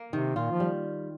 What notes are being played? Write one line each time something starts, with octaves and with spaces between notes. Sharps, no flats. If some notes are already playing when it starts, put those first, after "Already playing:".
Already playing: A#3
C3 D#3
A#2 F4
F3
G3